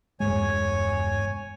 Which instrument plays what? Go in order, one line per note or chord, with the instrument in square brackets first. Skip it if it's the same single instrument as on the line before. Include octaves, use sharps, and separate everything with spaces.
[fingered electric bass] E1 G2 G#3 [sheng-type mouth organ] C#5 G#5